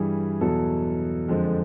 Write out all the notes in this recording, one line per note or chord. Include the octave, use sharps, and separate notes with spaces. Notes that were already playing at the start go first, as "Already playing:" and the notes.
Already playing: G2 E3 G3 G#4
E2 B2 F#3 A4
F2 D3 F3 G#3